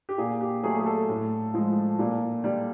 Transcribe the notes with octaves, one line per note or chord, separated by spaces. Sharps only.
G4
A#2 G#4
G4
F#3 A3 G#4
G#4
A4
A2
F3 G#3
A#2
G3